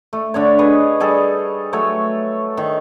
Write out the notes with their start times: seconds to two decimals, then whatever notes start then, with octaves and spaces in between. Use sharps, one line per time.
0.13 A3
0.34 D3 D4 C#5
0.59 G#4 B4 C#5 D#5
1.00 G3 G#4 A4
1.73 F#3 A3 A4 C#5
2.57 D#3